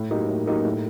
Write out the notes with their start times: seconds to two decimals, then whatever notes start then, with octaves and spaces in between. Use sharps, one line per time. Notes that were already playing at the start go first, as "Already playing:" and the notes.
Already playing: A2
0.10 F#3 A#3 D#4 G4
0.28 A2
0.46 F#3 A#3 D#4 G4
0.65 A2